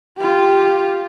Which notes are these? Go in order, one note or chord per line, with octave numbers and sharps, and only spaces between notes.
F4 G4